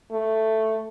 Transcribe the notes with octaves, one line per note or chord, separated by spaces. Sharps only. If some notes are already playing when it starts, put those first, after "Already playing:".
A3